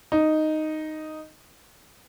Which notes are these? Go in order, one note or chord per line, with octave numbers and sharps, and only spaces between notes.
D#4